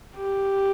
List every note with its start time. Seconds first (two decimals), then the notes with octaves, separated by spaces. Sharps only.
0.16 G4